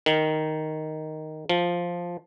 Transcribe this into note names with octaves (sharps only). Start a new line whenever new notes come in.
D#3
F3